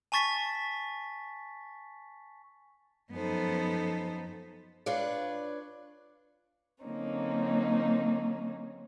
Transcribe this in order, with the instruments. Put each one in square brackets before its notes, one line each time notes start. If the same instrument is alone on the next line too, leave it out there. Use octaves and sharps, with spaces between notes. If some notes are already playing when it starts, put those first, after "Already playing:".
[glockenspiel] G#5 A5 C#6 A6 B6
[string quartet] F#2 F3 B3 D#4 A4 C5
[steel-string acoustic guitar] D4 F4 B4 C#5 D5
[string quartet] D3 F#3 A#3 C4 C#4 D#4